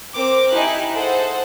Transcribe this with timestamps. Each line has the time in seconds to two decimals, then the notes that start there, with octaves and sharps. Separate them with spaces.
0.15 C4 A#4 D6
0.52 D#4 E4 G4 G#5 F#6
0.93 G#4 A4 C5 F#5